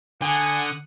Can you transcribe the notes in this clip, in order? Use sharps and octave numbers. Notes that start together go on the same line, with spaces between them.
D3 F#5 G#5 D#6